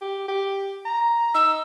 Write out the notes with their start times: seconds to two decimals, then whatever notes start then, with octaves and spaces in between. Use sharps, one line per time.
0.01 G4
0.28 G4
0.85 A#5
1.35 D#4 E6